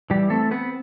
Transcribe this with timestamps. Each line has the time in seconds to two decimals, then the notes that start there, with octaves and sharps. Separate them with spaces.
0.10 E3 G3 G4
0.30 A3 C4 A4
0.51 B3 C4 B4